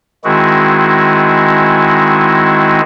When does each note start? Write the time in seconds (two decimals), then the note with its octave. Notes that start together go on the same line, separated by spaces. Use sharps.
0.25 D#3 G#3 C4 E4 F#4 G#4